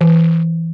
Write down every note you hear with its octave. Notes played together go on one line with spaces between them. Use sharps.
E3